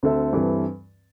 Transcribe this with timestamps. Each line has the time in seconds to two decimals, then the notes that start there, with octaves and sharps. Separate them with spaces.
0.03 D2 D3 C4 A4 E5
0.33 G2 E3 C4 A4